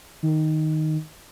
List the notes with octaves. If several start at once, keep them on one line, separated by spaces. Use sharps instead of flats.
D#3